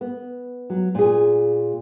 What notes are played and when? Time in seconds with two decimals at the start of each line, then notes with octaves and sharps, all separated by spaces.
0.01 B3
0.70 F#3
0.95 A#2 G#4